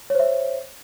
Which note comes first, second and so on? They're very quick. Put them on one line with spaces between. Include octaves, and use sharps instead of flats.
C#5 C5 E5